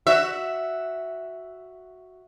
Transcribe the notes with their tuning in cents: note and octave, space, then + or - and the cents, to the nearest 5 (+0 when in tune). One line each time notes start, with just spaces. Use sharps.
F#4 +0 E5 +0